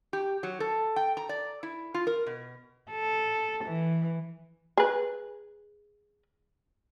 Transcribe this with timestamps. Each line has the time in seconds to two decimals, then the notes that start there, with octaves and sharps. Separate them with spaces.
0.13 G4
0.43 F#3
0.60 A4
0.96 G5
1.17 A#5
1.29 D5
1.63 E4
1.94 F4
2.07 A#4
2.26 B2
2.91 A4
3.64 E3
4.77 G#4 B4